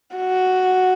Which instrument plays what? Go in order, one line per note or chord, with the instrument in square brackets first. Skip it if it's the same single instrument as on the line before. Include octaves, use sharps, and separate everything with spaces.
[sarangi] F#4